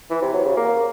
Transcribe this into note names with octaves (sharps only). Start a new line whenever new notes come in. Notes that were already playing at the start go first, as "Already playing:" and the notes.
E3
C3
F#3
C#3
A#3